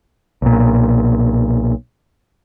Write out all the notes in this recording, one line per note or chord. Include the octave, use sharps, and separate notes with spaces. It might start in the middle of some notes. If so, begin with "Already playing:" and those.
B1 A#2